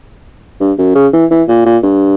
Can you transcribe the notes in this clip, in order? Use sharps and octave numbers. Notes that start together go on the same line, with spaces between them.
G2
F#2
C#3
E3
E3
A#2
A#2
G2